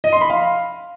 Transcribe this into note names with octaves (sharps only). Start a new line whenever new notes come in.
D#5
C6
B5
F5